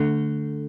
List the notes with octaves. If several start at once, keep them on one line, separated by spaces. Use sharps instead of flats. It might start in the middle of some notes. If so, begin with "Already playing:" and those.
Already playing: D3 A3 D4 A4